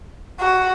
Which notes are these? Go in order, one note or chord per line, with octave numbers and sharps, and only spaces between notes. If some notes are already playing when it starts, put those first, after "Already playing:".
F#4